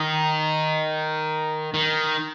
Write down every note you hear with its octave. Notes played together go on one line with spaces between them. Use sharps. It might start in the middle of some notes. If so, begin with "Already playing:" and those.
Already playing: D#3
D#3